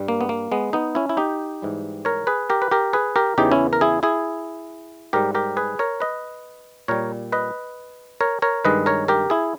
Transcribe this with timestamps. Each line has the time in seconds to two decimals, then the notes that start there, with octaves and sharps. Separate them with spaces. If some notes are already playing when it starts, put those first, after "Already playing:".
Already playing: G2 G3
0.08 A#3
0.21 B3
0.29 A#3
0.52 G#3 B3
0.73 B3 D#4
0.95 C#4 E4
1.09 E4
1.17 D#4 G4
1.62 G#2 E3 G3
2.05 A#4 C#5
2.27 G#4 B4
2.50 G4 A#4
2.62 B4
2.71 G4 A#4
2.93 G#4 B4
3.16 G4 A#4
3.38 E2 C#3 E3 D#4 G4
3.52 C#4 E4
3.73 A#4
3.81 E4 G#4
4.03 E4 G#4
5.13 G#2 G3 G4 A#4
5.35 G4 A#4
5.57 G#4 B4
5.79 A#4 C#5
6.00 B4 D#5
6.88 A#2 G3 A#4 C#5
7.32 B4 D#5
8.21 A#4 C#5
8.42 A#4 C#5
8.65 G2 D#3 G#3 B4 D#5
8.86 A#4 C#5
9.08 G4 A#4
9.30 E4 G#4